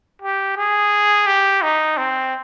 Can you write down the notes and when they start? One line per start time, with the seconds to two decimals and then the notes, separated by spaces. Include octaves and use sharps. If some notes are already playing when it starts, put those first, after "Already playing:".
0.22 G4
0.57 G#4
1.27 G4
1.62 D#4
1.97 C4